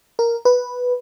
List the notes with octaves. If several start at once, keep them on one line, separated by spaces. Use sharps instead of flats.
A#4
B4